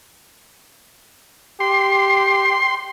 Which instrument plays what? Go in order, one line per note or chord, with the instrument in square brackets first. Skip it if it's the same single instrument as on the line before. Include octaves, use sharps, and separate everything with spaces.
[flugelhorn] G4 [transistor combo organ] C6